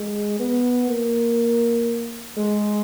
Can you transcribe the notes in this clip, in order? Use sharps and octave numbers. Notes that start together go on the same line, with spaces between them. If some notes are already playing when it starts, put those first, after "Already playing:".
Already playing: G#3
B3
A#3
G#3